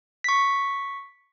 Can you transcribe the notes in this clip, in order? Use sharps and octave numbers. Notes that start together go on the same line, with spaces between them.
C#6 B6